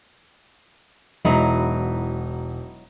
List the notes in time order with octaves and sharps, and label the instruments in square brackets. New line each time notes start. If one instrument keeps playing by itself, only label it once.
[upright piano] E1 [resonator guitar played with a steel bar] F#3 D#4 E4